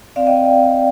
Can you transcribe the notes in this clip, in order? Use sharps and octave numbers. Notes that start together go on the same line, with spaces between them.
C4 D5 F5
D#5 G5